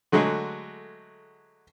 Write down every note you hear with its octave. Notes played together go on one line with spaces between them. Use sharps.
D3 F#3 G#3 A3 G#4